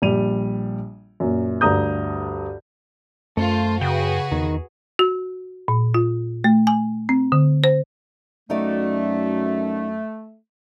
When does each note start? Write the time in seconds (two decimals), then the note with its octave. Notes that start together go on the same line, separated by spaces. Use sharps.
0.02 A#1 G3 D#7 F7
1.20 F#2 A#2
1.61 D2 G2 A#5 D#6 G6
3.37 F#2 A3 F4 C5
3.81 C#3 F#4 G#4 B4 G5
4.32 E2 D#3
4.99 F#4
5.68 A#2
5.94 F4
6.44 A3
6.67 G#5
7.09 C4
7.32 D3
7.64 C5
8.50 F#2 A3 D#4 F#4 D5